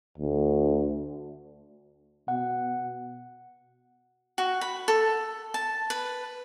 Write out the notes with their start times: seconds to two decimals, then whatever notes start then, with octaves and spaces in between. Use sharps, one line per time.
0.18 D2
2.28 B2 F#5
4.38 F#4
4.61 B5
4.88 A4
5.54 A5
5.90 B4